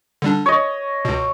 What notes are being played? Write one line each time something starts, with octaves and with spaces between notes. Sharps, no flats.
D3 G3 D4
C#5 D#5
C#2 B2